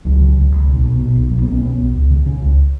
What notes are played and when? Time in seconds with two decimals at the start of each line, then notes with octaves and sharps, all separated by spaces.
0.05 C#2 F#3
0.21 C#3
0.37 C#2
0.52 C#2
0.68 B1
0.84 B2
0.99 B2
1.16 B1
1.31 B1 F#3
1.42 B3
1.47 B1
1.52 C#4
1.63 B1 B3
1.78 B1
1.95 C#2
2.11 C#3
2.26 C#3 C#4
2.42 C#2